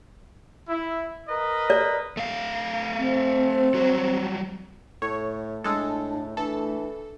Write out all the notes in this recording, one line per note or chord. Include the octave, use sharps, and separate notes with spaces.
E4
A#4 B4 D#5
D5
A3 F5
C4
F#3 G3 F#4
A2 A3 C#5
A2 G#3 D4 A4
E3 D4 A4